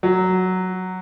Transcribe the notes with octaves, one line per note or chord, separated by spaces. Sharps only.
F#3